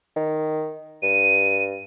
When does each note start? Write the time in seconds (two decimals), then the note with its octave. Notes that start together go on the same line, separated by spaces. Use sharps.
0.16 D#3
1.02 G2 D#7